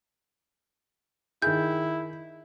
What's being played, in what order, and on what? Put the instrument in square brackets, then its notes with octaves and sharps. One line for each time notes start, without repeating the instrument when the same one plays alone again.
[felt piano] D#3 G#4 [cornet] E4 [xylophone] G6